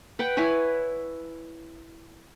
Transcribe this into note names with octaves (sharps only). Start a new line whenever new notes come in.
B4 F#5 G5
E4 B4 C#5 G#5